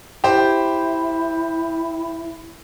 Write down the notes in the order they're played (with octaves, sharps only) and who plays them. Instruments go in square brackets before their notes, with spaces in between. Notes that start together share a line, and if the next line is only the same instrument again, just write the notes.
[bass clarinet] E4 [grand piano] G4 C5